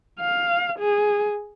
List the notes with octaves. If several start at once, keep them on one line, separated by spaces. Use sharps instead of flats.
F5
G#4